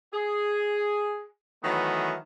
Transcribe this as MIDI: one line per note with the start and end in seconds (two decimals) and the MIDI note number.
0.13 1.26 68
1.64 2.14 51
1.64 2.14 52
1.64 2.14 54
1.64 2.14 57
1.64 2.14 59